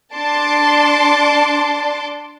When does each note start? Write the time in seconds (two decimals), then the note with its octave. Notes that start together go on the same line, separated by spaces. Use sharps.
0.15 D4 A5 C6 D6